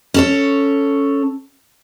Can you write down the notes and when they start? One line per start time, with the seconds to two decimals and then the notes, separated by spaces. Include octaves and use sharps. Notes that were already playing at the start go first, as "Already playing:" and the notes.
0.14 C#4 A4 C#5